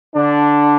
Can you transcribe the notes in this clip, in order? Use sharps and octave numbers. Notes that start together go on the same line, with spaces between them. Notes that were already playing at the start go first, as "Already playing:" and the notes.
D3 D4